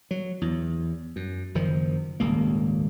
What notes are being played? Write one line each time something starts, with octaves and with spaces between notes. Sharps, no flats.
F#3
E2
F#2
F#1 D#3 F3
D#1 G#1 C#2 A#3